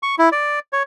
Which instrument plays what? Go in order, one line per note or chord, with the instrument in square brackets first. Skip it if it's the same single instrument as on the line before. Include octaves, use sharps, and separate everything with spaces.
[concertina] C#6
E4
D5
C#5